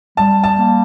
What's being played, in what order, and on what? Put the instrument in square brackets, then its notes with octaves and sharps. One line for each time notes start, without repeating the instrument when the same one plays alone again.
[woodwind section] G3 [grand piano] A5
[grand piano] A5
[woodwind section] A#3